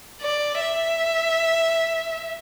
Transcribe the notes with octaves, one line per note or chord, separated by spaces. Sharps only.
D5
E5